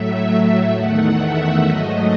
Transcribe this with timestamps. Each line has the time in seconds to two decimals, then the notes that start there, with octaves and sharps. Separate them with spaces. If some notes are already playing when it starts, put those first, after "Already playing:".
Already playing: A2 F#3 A3 E5
0.70 E2 D#3 A3 F#5
1.15 E5
1.61 G#2 F#3 A3 D#5